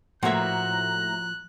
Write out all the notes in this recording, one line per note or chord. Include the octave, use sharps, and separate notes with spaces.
A2 F3 A#3 F#4 C#5 E5 A#5 F#6